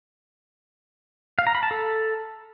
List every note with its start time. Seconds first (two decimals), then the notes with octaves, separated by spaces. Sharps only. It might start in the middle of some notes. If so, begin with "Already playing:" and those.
1.39 F5
1.47 A#5
1.55 B5
1.63 A5
1.71 A4